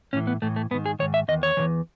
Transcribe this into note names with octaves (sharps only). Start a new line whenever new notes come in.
A2 E3 C#4
B3
A2 E3 A3
A3
G#2 D#3 B3
G#4
G#2 D#3 C#5
E5
E2 D#3 D#5
C#5
E2 C#3 E3